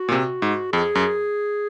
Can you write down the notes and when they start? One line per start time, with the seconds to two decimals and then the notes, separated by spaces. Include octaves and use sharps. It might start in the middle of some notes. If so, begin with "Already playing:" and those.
Already playing: F#4
0.09 A#2
0.12 C3
0.42 G#2
0.73 F2 G#4
0.95 F#2